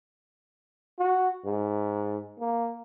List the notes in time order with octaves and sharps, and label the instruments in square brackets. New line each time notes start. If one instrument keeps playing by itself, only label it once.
[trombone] F#4
G#2
A#3